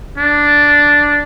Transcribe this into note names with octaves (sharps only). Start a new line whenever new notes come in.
D4